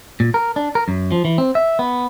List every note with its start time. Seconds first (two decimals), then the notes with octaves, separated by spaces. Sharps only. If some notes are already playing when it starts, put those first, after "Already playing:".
0.20 A#2
0.34 A#4
0.56 D4
0.75 A#4
0.88 F#2
1.12 F3
1.25 E3
1.38 C4
1.55 E5
1.79 B3